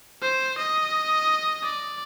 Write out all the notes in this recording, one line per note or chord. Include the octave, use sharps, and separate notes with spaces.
C5
D#5
D5